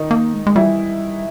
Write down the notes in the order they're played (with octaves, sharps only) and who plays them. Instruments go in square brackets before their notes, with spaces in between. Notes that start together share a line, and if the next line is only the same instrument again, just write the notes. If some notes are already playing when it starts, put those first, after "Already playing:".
Already playing: [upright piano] D#3 D#4
[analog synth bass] A#3
G#3
G#3
[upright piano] E3 E4 [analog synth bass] G3